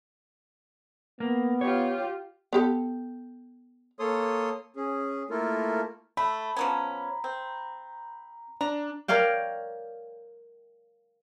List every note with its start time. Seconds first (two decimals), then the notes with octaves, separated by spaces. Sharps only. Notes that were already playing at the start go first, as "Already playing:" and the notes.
1.20 A#3 B3
1.61 F4 G4 C#5
2.53 B3 G4 A4
3.99 A#3 A4 C#5 C6 D#6
4.76 C#4 G#4
5.30 A3 A#3 E4 F4 A4 A#4
6.17 A3 B5
6.57 F3 B3 C#4 A#5
7.24 C4
8.61 D4 A#5
9.08 A#4 C#5 D5 F5 G5